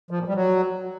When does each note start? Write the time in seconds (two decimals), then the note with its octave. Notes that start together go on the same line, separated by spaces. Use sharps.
0.11 F3
0.19 A#2
0.27 G3
0.35 F#3